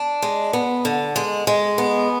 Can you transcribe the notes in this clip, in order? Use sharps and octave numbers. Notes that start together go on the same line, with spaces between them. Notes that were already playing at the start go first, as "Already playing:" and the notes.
Already playing: D4
G#3
B3
D3
G#3
G#3
B3